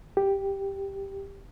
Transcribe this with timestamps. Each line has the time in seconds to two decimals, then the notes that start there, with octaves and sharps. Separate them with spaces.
0.17 G4